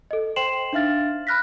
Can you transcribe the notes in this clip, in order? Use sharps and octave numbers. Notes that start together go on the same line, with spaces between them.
A4 D#5
C5 G5 C6 C7 E7 F#7
D4 D#4 E5 F5 F6 A6
B5 F6 F#6 A#6 B6